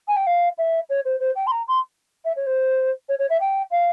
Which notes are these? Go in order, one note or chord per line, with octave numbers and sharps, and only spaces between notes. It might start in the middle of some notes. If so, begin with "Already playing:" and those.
G#5
G5
F5
E5
C#5
C5
C5
G5
C6
A#5
C6
E5
C#5
C5
C#5
C#5
E5
G5
F5